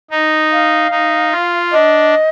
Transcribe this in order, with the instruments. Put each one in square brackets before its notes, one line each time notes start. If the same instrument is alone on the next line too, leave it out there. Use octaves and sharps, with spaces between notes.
[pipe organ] D#4
[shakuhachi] F5
[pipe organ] D#4
F4
[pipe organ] D4 [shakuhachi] D#5